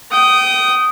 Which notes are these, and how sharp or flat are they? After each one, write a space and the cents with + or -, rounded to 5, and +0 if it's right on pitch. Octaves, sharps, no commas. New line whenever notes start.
G5 -35 D#6 +0